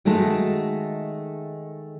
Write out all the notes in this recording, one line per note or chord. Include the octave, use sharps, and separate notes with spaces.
D#3 G#3 A3 F#4 A5